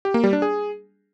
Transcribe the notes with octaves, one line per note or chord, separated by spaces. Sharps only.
G4
A#3
G3
D4
G#4